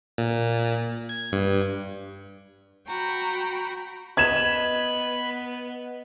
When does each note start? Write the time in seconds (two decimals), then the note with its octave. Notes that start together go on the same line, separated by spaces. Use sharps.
0.18 A#2
1.09 G#6
1.32 G2
2.87 F#4 G5 A#5 B5
4.17 B3 D#5 B5 G#6 E7